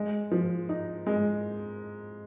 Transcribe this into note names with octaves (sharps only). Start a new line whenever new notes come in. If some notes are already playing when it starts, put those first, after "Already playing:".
Already playing: G#3
F3
D#4
G#3